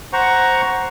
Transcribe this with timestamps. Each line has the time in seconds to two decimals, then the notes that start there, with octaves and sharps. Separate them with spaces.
0.13 C5 F#5 A#5 C#6